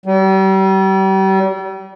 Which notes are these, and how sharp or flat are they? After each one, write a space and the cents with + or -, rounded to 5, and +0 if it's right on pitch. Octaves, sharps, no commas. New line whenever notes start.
G3 -35